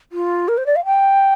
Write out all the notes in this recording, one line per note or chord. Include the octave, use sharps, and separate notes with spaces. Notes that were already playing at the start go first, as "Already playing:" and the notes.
F4
A#4
C5
D5
F5
G5